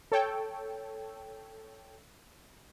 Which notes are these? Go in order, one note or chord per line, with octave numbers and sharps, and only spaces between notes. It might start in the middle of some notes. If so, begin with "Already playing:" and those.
A4 C#5 G5